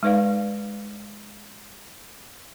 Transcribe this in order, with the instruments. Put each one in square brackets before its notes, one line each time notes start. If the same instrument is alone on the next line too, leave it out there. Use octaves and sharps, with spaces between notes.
[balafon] G#3 D#4 B4 D5 F5